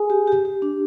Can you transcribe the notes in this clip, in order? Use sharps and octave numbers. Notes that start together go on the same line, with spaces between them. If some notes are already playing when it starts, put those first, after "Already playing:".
Already playing: G#4
G4
G4
G4
D4